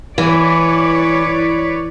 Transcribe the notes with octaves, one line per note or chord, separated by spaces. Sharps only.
E3 B4 C#5 D5